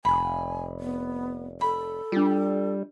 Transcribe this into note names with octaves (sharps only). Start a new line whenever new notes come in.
F1 G#5 B5
B3
A4 B5
G3 D4 F4